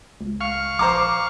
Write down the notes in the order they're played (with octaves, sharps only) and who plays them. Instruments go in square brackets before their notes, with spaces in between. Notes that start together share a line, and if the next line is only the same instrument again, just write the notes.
[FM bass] C#2
[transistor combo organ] F5 C#6
[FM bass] A#1 [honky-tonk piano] C5 A#5 D6